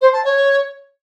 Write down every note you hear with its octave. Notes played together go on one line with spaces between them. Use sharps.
C5
A5
C#5